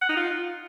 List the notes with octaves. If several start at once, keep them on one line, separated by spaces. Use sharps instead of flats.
F#5
D#4
F4